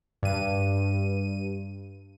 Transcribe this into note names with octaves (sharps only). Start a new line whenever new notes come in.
G2 D#7